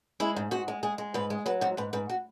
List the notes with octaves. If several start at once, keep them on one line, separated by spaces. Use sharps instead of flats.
G#3 E4
G#2
G#2 F#4
G#3
G#3 G#4
G#3
G#2 B4
G#3
F#3 B4
G#2 F#4
G#2 B4
G#2 B4
F#4